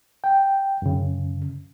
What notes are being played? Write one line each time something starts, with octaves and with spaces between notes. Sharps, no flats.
G5
F#2 C#3